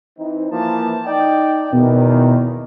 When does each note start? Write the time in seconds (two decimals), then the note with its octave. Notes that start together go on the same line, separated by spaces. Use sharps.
0.18 E3 C4 D#4
0.51 E3 F3 A#3 A5
1.07 D#4 D5 G5
1.73 E2 B2 D#3